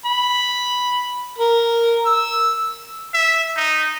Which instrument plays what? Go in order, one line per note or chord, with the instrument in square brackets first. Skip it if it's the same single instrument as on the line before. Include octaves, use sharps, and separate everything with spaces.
[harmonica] B5
A#4
E6
[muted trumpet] E5
D#4